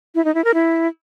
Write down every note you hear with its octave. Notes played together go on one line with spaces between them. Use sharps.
E4
D#4
E4
A#4
E4